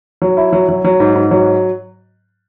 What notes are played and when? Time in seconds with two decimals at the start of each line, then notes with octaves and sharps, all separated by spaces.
0.22 F#3
0.37 E4
0.53 F#3
0.69 F#3
0.84 F#3
1.00 G#2
1.15 G#2
1.31 F#3